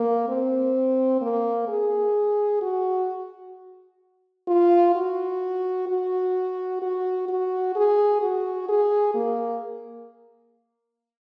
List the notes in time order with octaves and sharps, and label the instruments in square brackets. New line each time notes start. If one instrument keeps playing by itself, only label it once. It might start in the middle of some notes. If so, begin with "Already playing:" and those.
Already playing: [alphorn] A#3
C4
A#3
G#4
F#4
F4
F#4
F#4
F#4
F#4
G#4
F#4
G#4
A#3